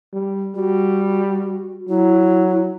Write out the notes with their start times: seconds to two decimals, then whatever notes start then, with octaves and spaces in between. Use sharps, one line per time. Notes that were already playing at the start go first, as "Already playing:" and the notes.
0.13 G3
0.55 G3 F#4
1.89 F#3 E4